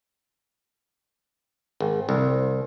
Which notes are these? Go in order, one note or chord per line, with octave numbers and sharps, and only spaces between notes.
G#1
C2